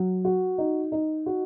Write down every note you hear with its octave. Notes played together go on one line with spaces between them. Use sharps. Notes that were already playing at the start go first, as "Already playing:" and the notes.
Already playing: F#3
F#4
D#4
D#4
F#4